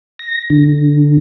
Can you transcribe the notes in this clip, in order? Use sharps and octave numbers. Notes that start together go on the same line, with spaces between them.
A#6
D3